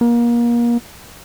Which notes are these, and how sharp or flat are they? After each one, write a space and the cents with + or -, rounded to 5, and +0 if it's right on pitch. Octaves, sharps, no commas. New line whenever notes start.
A#3 +30